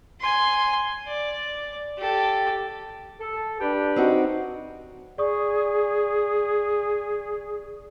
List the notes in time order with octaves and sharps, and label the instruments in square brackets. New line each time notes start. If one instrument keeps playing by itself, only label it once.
[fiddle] G#5 C6
D5
G4 A4
[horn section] A4
D4 G4 B4
[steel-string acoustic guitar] C4 D#4 F#4
[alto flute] G#4 [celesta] D5 C#6 D#6